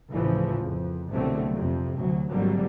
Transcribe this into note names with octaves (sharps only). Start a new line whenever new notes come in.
A1 D2 C#3 E3 F3
F2
C2 B2 D3 F#3 A3 C4
F2 C3
D2 F#3
G#1 D3 F#3 G3 A#3